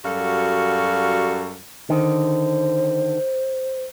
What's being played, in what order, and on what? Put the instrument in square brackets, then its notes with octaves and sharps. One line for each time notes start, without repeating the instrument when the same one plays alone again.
[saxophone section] F#2 G3 F#4 A4 F5
[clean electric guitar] D3 D#3 [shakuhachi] C5